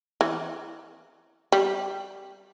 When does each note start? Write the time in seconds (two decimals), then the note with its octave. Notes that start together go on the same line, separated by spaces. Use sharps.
0.21 E3
1.52 G3